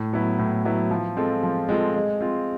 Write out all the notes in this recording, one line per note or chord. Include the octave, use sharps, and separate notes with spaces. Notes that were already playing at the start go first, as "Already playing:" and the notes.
Already playing: A2
F#3 B3 E4
A2
F#3 B3 E4
F3
G#3 C4 F4 A4
F3
G#3 C4 F4 A4
G#3
C4 F4